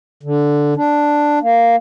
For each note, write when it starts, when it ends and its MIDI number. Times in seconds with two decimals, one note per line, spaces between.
0.23 0.74 50
0.77 1.39 62
1.42 1.76 58